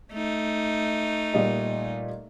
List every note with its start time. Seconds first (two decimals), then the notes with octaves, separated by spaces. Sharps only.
0.12 A3 D#4
1.34 A#2 G3 D#5